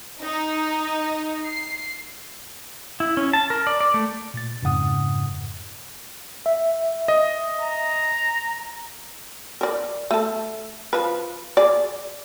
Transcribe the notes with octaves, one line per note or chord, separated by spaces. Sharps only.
D#4
C7
E4
C#4
A5
A#4
D5
D5
A3
A#2 A6
F2 G#2 C#3 F#5 D#6
E5
D#5
A#5
A#4 D5
A3 A4
F3 B4
G#4 D5